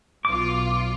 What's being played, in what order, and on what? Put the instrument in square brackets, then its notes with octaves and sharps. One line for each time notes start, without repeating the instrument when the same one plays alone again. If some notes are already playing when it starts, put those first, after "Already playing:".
[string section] B1 F4 [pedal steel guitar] D6